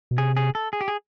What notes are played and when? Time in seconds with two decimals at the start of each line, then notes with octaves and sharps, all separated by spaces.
0.11 B2
0.18 C3 G#4
0.37 G#4
0.55 A4
0.73 G#4
0.81 G4
0.88 G#4